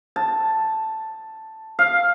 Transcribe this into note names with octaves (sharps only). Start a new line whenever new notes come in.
A5
F5